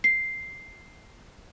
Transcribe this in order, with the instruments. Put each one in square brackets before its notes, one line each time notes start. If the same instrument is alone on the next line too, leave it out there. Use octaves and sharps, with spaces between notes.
[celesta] C7